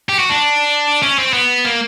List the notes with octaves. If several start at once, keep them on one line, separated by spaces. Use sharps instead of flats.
G4
F#4
D4
C#4
C4
B3
A#3